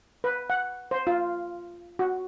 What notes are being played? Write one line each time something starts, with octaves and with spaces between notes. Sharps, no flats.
B4
F#5
C5
F4
F#4